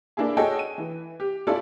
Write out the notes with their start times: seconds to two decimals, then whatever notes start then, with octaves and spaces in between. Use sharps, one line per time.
0.17 A#3 D4 E4 G#4
0.37 F#4 G#4 A4 C#5 D#5 G5
0.59 D#7
0.78 E3
1.20 G4
1.47 C#4 E4 F4 A4 D5